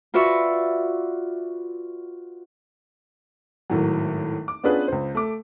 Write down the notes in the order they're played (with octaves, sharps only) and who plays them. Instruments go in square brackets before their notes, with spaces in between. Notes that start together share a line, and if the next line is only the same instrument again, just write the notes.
[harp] F4 F#4 B4 D5 E5 C#6
[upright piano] G#1 A2 F#3
D6
B3 C#4 D4 F4 G#4 B4
C#2 C5
A3 D6